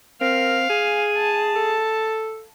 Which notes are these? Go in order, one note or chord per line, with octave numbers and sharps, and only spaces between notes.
C4 A#4 F5
G#4 G#5
A5
A4